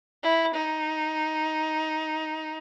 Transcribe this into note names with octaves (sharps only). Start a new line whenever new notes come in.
E4
D#4